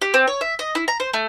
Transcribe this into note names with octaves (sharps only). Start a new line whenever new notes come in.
G4
C4
C#5
E5
D#5
E4
A#5
C5
A3